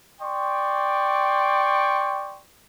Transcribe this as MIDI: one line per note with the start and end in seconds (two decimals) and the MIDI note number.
0.21 2.41 74
0.21 2.41 79
0.21 2.41 84
0.21 2.41 85